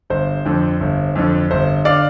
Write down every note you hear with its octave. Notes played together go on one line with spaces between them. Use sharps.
G1 C5
F2 D3
G1
F2 D3
G1 C5
D3 D5 F5